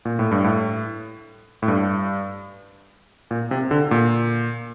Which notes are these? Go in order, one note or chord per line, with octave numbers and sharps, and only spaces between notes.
A#2
A2
G2
A2
A2
G2
A#2
C3
D3
A#2